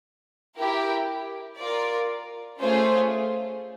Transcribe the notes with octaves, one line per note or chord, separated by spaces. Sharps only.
E4 G4 A#4
F4 A#4 D5
A3 C#4 F4 G#4 C5